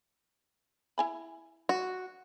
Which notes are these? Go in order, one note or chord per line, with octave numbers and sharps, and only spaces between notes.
E4 G#5 B5
F#4